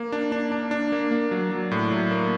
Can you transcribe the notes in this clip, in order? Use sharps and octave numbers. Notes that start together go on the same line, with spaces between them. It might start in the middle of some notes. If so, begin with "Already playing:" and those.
Already playing: A#3
D4
D4
D4
D4
A#3
A#3
F#3
F#3
A2
F#3
A#3